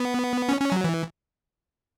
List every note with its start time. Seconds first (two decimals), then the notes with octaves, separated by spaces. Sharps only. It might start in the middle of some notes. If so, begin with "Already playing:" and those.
Already playing: B3
0.49 C#4
0.61 C#4
0.72 F#3
0.84 E3